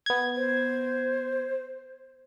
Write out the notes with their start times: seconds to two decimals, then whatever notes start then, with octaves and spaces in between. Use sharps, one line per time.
0.06 B3 G#6
0.36 C5